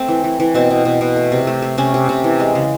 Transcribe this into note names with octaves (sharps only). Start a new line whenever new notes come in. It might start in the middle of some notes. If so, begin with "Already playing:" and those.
Already playing: A3 C4
E3
E3
E3
B2 C4
B2
B2
B2
A3
C3
A3
A3
C3 C#4
C3
C3
E3
G#3
C#3